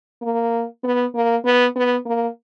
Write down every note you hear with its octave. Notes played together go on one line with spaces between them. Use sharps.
A#3
B3
A#3
B3
B3
A#3